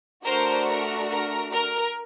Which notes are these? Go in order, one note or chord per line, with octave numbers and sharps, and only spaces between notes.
A3 D4 F#4 A#4 C5
A#4
A#4
A#4